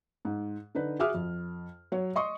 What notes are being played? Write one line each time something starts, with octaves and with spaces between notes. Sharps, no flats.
G#2
D3 D#4 B4
F#4 G#4 E5 D6 D#6 F6
F2
F#3 C#5
D#5 C6 C#6 D#6